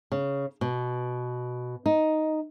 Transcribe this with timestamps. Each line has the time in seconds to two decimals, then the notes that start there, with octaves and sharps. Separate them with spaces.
0.12 C#3
0.61 B2
1.86 D#4